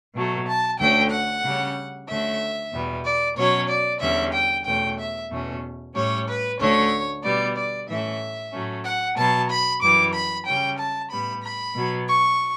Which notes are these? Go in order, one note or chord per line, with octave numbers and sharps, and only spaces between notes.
B2 F#3 A3
A5
D2 D3 A3 C#4 G5
F#5
C#3 G3 C#4
D2 D3 A3 C#4 E5
E2 B2 G3 B3
D5
B2 F#3 C#4 C#5
D5
E2 D3 G3 C#4 E5
G5
E2 B2 A3 C#4 G5
E5
E2 B2 A3 C#4
A2 G3 C#4 C#5
B4
D2 D3 A3 C#4 C#5
B2 G3 B3 D5
D5
A2 E3 A3 C#4 E5
A2 F#3 A3 C#4
F#5
B2 F#3 B3 A5
B5
F#2 E3 G3 D6
B5
C#3 G3 C#4 G5
A5
A2 G3 B3 B5
B5
B2 F#3 B3
C#6